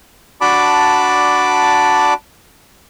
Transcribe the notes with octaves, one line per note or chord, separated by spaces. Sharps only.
D4 F#4 D5 A5 B5 D6